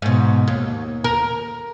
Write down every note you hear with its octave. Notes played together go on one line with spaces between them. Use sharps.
G#2 B2
D#2
A#4